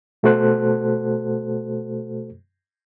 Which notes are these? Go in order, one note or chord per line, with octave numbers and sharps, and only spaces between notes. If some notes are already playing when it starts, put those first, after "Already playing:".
B2 A3 F#4 A4 C5 F#6